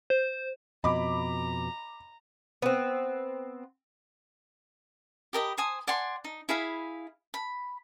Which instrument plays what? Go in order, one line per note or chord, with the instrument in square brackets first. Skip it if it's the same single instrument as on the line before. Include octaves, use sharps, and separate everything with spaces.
[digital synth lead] C5
[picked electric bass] F2 B2 [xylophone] D#5 [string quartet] A#5 [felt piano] B5 D6
[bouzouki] B3 C4
[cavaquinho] G4 A#4 D#5 B5
C5 G#5 D#6
D5 F#5 G#5 C6
D#4
E4 G#4 F5 B5
B5